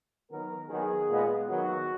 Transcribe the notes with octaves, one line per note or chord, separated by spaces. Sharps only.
D#3 F#3 B3 A#4
D#3 F#3 B3 G#4
A#2 G#3 B3
D#3 F#3 B3 F#4